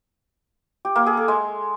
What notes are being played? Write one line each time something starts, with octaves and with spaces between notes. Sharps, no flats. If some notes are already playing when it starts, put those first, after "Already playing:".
G4
A#3
G#4
A4
G#3